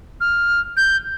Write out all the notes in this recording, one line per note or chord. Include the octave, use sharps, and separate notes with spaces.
F6
G6